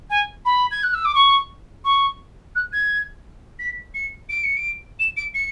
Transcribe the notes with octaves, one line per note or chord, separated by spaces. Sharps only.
G#5
B5
G#6
F#6
E6
D6
C#6
C#6
F#6
G#6
B6
C#7
D7
C#7
D7
E7
D7
C#7